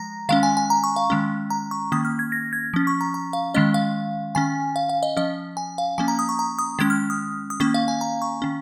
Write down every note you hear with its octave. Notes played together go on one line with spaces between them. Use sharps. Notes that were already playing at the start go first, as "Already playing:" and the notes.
Already playing: F3 G#3 A#5 A#6
D#3 G#3 C#4 F5
G#5
G#5
A#5
C#6
F5
D#3 G#3 C#4
A#5
C#6
D#3 A#3 C#4 D#6
F6
G#6
A#6
G#6
F3 C#4
C#6
A#5
A#5
F5
D#3 G#3 C#4 D#5
F5
D#3 C#4 G#5
F5
F5
D#5
F3 C#4 D#5
G#5
F5
F3 A#3 C#4 G#5
A#5
D#6
C#6
A#5
D#6
D#3 G#3 C#4 G#6
F6
D#6
D#6
D#3 A#3 C#4 C#6
F5
G#5
A#5
C#6
D#3 C#4